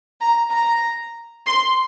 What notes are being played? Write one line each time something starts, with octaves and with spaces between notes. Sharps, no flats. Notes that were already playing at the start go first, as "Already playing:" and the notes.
A#5
A#5
C6